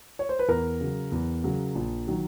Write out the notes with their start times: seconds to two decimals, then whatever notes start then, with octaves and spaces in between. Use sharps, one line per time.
0.19 C#5
0.29 C5
0.39 B4
0.48 E2 A#4
0.81 C#3 F#3
1.12 E2
1.44 C#3 F#3
1.75 A#1
2.08 D#3 F#3